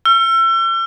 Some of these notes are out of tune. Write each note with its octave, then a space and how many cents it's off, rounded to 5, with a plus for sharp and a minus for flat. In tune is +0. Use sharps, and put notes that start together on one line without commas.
E6 +40